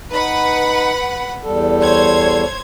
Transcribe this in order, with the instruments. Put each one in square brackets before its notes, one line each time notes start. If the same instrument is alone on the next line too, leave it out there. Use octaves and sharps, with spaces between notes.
[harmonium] D#4 [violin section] B4 F#5 B5
[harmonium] E2 G3 A4
[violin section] C5 C#5 G#6